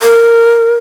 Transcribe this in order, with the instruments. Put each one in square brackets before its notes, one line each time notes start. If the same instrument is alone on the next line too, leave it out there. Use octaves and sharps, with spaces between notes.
[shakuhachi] A#4